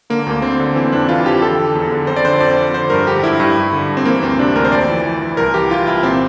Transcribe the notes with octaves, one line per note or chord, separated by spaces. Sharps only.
D3 A#3
D2 A#3
D3 C4
D3
E3 C4
F2 D4
E3 F4
F2 G4
D3 A4
D3
E2
D3
F2 C5
D5
D3 C5
F2 D5
F2
D3 C5
G2 A#4
D3 G4
G2 E4
G2 E4
G2
D3
G2
C4
E3 A#3
D2 C4
C3 D4
D2 A#4
C5
F2 D5
E3
E3
E3
C2 A#4
E3 G4
E3 F4
C2 E4
A#2 C4